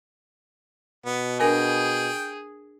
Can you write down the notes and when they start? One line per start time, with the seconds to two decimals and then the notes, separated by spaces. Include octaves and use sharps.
1.06 B2 B3
1.40 D4 G#4 A#4 G5 G#5